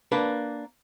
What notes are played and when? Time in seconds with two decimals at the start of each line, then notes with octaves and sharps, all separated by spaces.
0.12 A#3 D4 B4